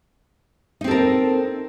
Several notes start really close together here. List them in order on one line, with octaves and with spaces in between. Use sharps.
D#4 C4 A4 A#4